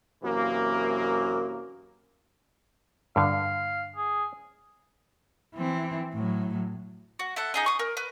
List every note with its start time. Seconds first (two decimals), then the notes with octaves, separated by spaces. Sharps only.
0.23 F#2 C3 E3 A#3
3.16 G2 D3 F5
3.96 G#4
5.55 E3 C4
6.14 A2 F#3
7.19 F#4
7.36 E4 A4 F#5
7.54 D#4 G#4 D#5
7.66 C#6 D#6
7.79 A#4
7.97 B4